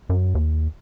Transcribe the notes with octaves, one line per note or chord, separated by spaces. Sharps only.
F#2
D#2